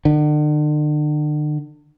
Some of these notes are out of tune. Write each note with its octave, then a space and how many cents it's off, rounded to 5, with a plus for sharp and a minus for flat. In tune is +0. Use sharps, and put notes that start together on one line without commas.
D3 +40